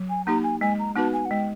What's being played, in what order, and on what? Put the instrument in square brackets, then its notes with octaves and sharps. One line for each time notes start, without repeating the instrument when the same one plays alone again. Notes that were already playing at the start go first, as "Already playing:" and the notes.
Already playing: [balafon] F#3
[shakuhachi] G#5
[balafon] A#3 D#4 G4 [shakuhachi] A#5
[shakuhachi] G#5
[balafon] G#3 [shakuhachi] G#5
[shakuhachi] A#5
[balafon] B3 D#4 F#4 B4 [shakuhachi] A5
[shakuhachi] G#5
F#5
[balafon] G#3 [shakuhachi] G5